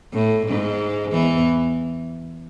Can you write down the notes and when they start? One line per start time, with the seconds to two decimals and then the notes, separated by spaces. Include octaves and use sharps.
0.14 A2
0.47 G#2
1.12 E2 E3